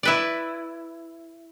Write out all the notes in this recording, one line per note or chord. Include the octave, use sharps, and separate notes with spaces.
E4 B4 D5